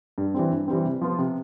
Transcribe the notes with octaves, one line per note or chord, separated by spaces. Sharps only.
G2
E3 G3 C4
G2
E3 G3 C4
C3
F3 B3 F4
C3